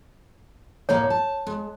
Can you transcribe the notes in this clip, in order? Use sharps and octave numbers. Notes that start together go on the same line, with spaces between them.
D2 A2 A#3 C#5
A5
G#3